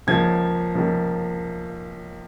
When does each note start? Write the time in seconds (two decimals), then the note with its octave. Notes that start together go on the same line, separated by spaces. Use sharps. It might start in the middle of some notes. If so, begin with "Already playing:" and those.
0.07 C#2 C#3 F3 A#3 G#6
0.74 C#2 C#3 F3 A#3